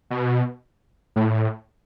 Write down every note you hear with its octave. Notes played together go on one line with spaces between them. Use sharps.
B2
A2